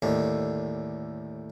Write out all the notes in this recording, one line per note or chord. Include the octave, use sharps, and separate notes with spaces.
D#2 A2 D3